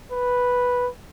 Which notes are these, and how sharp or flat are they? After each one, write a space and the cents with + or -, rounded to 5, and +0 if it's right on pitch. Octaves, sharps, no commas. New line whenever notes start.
B4 -5